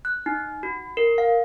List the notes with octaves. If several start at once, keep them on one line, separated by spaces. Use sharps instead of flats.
F#6
D#4
F#4
A#4
F5